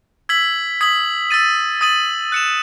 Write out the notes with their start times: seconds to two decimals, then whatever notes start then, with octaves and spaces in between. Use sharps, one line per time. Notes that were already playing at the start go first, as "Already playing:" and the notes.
0.29 E6 G#6 B6 F#7
0.81 D#6 G#6 B6 F#7
1.30 E6 A6 D#7
1.81 D#6 A6 D#7 F#7
2.32 F#6 C#7 E7